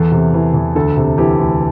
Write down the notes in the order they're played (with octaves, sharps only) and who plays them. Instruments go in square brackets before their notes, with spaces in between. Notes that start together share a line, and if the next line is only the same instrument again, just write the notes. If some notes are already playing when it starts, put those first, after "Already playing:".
Already playing: [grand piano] E2 A4
C3
E3
E2
D2 A4
C3
E3 G4
D2